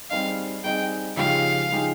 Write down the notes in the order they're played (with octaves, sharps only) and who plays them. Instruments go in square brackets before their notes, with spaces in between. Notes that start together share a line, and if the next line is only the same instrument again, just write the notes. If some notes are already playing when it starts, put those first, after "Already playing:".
[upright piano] G3 C4 D#4 G#4 D#5 [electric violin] F5
[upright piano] G3 C4 D#4 G#4 D#5 [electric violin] G5
[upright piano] C#3 F3 G#3 D#4 G4 [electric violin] F5
[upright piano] C#3 F3 G#3 D#4 G4